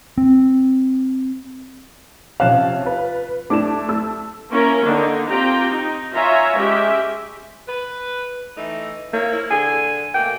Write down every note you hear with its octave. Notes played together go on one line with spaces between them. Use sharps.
C4
C3 F3 C#4 F5 F#6 E7
F4 B4
A3 D4 E4 D6 E7
A3 E6
A#3 C#4 E4 A#4
D3 D#3 A#3 D4 D#4
C4 F4 G4 G5 A#5
D#4
F4 C#5 E5 G#5 A#5
G#3 C#4 G4 D#5 E5
B4
E3 A3 D#4
A#3 E4 C#5 E5
F3 E4
D3 G#5
B2 A3 A#3 G5